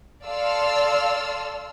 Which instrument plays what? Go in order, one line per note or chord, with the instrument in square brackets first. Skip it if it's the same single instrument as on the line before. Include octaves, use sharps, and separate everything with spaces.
[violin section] A4 D5 F5 C6 E6 F6